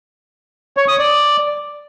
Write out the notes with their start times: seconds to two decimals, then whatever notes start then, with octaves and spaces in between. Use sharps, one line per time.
0.77 C#5
0.88 D#6
0.99 D5